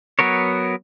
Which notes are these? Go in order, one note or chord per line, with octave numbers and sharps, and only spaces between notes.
F#3 B3 A#4 C#5